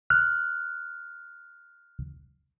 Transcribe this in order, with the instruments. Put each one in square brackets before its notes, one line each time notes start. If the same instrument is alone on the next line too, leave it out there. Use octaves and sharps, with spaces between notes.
[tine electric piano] F6 F#6